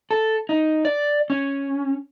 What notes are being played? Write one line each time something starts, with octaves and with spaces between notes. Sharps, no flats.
A4
D#4
D5
C#4